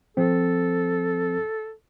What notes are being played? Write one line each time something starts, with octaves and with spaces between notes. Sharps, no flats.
F3 C4 A4